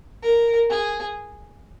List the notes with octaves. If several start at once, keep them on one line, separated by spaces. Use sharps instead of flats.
A#4
G#4